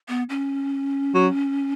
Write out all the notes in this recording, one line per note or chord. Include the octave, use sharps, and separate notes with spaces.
B3
C#4
F#3